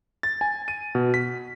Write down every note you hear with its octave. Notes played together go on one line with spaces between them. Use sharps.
A6
G#5
D#7
B2
B6